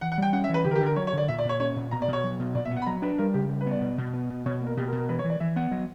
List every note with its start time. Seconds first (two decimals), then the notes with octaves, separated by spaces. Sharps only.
0.01 E3 F#5
0.12 F#5
0.18 G3 G5
0.33 C#4 F#5
0.44 E5
0.49 E3 B4
0.65 D3 G4
0.71 A#4
0.76 G4
0.80 D3
0.86 A#4
0.96 F#3 C#5
1.07 C#5
1.13 D3 D5
1.28 A#2 E5
1.38 D5
1.45 A#2 C#5
1.60 C#4 C#5
1.76 A#2
1.91 B2 A#5
2.02 D5
2.08 B2
2.13 C#5
2.24 F#3
2.40 B2
2.54 A#2 D5
2.65 E5
2.71 B3
2.76 F#5
2.82 B5
2.86 F#3 A#5
3.02 D4 B4
3.18 G3 A#4
3.34 C#3 G4
3.50 G3
3.61 B4
3.66 B3
3.71 D5
3.81 B2
3.98 B2
4.13 B3
4.30 B2
4.46 B2 C#5
4.61 A#3
4.66 A#4
4.77 B2 G4
4.87 A#4
4.92 B2
4.98 A#4
5.09 E3 B4
5.19 C#5
5.24 E3
5.30 D5
5.40 E3 E5
5.56 B3 F#5
5.71 F#3